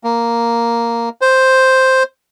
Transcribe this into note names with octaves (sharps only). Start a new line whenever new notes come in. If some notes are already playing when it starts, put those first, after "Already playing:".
A#3
C5